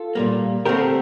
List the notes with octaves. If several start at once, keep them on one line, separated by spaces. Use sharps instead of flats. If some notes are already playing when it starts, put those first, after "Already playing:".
Already playing: F4 A4
A#2 G3 A#3
D3 A3 C4 G4 A#4